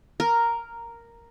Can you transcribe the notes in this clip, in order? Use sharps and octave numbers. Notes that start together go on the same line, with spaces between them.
A#4